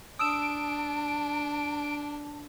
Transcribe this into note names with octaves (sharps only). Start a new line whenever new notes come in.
D4 A5 D#6 E6 D7 E7